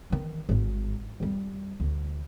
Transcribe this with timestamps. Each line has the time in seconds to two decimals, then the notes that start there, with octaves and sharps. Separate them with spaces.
0.10 D#3 E3
0.49 G#1 G#2
1.20 F2 G3
1.80 D2